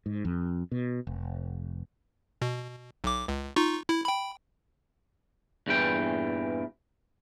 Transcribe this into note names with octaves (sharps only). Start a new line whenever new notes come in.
G#2
F2
B2
F1
B2
B1 D6
C#2
D#4 F4 C#6
E4
G5 B5
E2 G2 A#2 E3 G5